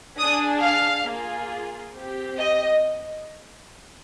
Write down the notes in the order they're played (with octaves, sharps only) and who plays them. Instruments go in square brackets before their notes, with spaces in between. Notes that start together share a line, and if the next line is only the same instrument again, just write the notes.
[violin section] D4 G#4 D#6
F5
A#3 F4 G#4
C4 G4
D#5